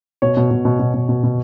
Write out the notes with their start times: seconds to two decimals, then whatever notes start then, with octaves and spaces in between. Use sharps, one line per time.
0.22 B2 C#5
0.37 B2
0.51 B2
0.65 B2
0.79 B2
0.94 B2
1.09 B2
1.24 B2